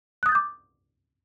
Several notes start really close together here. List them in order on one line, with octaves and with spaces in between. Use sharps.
F#6 D#6 A6 G6 D6